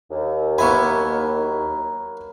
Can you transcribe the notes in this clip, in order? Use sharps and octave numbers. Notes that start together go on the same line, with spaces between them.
D#2
F#3 A#3 B3 E4 G#5 B5 C#6